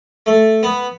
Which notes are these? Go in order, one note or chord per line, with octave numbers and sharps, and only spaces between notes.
A3
B3